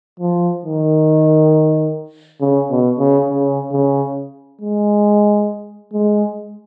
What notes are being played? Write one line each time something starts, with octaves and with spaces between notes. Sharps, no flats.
F3
D#3
C#3
B2
C#3
C#3
C#3
G#3
G#3